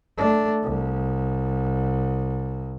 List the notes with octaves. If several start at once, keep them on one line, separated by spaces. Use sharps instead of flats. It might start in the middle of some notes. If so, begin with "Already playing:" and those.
A3 D4
C2